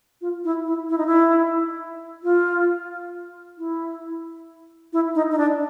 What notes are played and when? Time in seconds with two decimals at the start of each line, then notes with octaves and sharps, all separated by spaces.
0.21 F4
0.44 E4
0.66 E4
0.89 E4
0.98 D#4
1.06 E4
2.23 F4
3.58 E4
4.93 E4
5.15 D#4
5.32 D#4
5.38 D4